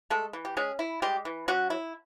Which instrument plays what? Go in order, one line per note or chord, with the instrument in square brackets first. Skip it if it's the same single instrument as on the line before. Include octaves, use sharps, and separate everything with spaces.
[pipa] G#3 A3 A4
E3
G4
G#3 C#4 G#4
E4
G3 G#3 G4
E3
F#3 C#4 F#4
E4